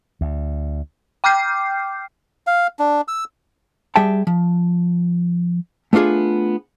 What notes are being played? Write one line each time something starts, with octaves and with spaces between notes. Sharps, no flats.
D2
G5 D6 F6 G6 C7
F5
D4
E6
G3 G#4 E5 G5 A5
F3
A3 B3 D4 F4 G#4